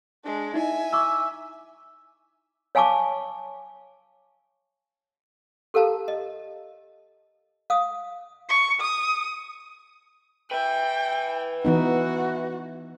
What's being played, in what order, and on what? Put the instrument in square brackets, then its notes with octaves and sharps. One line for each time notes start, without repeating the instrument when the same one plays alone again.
[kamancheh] G#3 D4
[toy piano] D#4 E4 D#5 [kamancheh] E5 G#5
[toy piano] A#5 C#6 D6 [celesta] E6
[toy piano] C#5 F5 G#5 A5 C#6 D6
G4 A4 A#4 F5 A5 A#5
D#5
F5 D#6
[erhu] C#6
D#6
[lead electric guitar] B4 E5 [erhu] G5
[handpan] E3 B3 D#4 [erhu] F#4